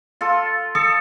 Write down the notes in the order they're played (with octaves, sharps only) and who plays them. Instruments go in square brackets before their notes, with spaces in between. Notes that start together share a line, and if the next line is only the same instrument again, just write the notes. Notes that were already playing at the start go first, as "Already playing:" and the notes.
[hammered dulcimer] F4 A4
[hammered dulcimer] A4 [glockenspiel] D#6 C#7